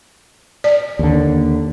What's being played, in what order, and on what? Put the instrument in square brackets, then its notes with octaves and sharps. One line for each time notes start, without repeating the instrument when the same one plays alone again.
[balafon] D5
[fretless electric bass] D#2 D3